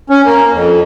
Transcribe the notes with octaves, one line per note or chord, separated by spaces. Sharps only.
C#4
A#3
F2